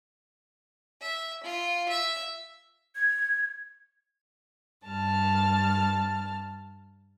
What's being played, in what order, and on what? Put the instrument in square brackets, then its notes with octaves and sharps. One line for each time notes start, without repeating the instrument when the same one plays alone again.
[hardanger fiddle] E5
F4
E5
[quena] G#6
[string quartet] G2 A5 F6